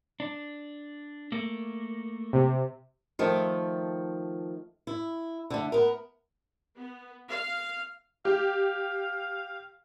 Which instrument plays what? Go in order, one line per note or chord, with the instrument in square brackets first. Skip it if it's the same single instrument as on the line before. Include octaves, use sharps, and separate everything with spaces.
[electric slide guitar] D4
A3 A#3
[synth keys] C3
[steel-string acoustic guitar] D#3 F3 A3
E4
D3 A3
B3 A#4
[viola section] B3
F5
[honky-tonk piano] G4 [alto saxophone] F5